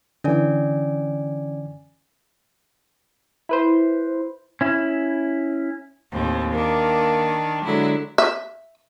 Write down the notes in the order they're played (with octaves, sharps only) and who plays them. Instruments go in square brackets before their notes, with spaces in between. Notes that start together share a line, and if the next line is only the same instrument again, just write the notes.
[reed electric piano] D3 E3 [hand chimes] C#4 D5 G#5
[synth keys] E4 B4 C5
[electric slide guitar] C#4 E4
[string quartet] D#2 A2 C4
[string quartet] D#3 D4 [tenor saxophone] A#3
[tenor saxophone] D3 [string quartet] F#3 G#3 E4
[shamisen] E5